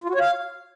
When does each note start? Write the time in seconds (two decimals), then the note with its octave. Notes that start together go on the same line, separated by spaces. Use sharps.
0.04 F4
0.10 F#4
0.15 C#5
0.21 F5